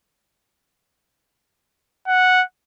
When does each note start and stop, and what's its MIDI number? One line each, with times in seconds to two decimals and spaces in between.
2.08 2.43 78